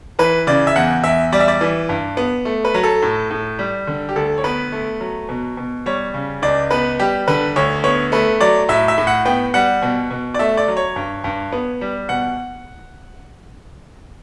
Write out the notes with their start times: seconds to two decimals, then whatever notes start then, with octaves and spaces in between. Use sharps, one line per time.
0.19 E3 B4
0.47 C#3 D5
0.67 E5
0.76 E2 F#5
1.04 E2 E5
1.32 G3 D5
1.40 E5
1.48 D5
1.61 E3
1.89 G2
2.17 B3
2.45 A3
2.65 B4
2.74 F#3
2.84 A4
3.02 A2
3.31 A2
3.59 G3
3.87 D3
4.09 G4
4.16 D2 A4
4.38 C#5
4.44 B3 B4
4.72 A3
5.00 F#3
5.29 B2
5.57 B2
5.86 G3 C#5
6.14 C#3
6.42 C#2 D5
6.71 B3 B4
6.99 G3 G4
7.28 D3 B4
7.56 D2 C#5
7.84 B3 C#5
8.12 A3 B4
8.40 F#3 D5
8.69 A2 E5
8.88 E5
8.98 A2
9.07 F#5
9.25 B3 G5
9.54 G3 F#5
9.82 B2
10.11 B2
10.34 D5
10.39 A3 E5
10.57 D5
10.68 F#3
10.77 C#5
10.96 G2
11.24 G2
11.52 B3
11.81 G3
12.09 B2 F#5